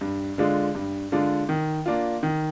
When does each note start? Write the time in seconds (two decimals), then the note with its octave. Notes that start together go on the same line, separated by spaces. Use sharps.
0.01 G2
0.38 D3 G#3 D4 F4
0.75 G2
1.12 D3 G#3 D4 F4
1.49 D#3
1.86 A#3 D4 F4
2.23 D#3